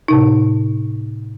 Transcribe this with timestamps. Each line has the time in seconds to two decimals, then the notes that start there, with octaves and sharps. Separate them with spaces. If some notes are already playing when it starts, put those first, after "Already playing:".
0.08 A2 C3 D#4